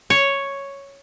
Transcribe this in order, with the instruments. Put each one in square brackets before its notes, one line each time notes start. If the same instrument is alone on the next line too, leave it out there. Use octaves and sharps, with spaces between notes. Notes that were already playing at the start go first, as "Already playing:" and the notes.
[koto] C#5